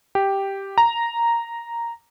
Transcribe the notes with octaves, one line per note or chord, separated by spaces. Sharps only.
G4
A#5